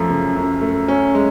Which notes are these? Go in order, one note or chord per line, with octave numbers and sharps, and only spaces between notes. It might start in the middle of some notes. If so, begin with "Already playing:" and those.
Already playing: F#2 F3 A3
C#3
F#2
A3
C#4
G#3